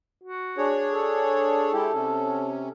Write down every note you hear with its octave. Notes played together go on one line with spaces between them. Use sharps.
F#4
D4 G#4 C#5
A4
G#3 E4 G4
C3 C#4